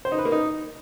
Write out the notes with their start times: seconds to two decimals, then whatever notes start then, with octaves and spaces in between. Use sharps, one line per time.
0.05 C5
0.12 D#4
0.19 B4
0.25 A#3
0.32 D#4